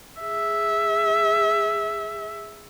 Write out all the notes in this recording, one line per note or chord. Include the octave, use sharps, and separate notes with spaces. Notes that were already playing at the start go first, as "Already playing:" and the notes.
G#4 E5